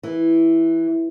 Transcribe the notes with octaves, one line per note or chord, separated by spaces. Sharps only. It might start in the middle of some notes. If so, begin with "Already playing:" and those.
E3